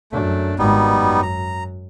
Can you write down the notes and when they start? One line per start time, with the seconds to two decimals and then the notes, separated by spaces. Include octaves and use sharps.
0.12 F#2 A3 D4
0.59 G#1 G#2 G3 B3 D#4
0.91 F#2
1.22 A#5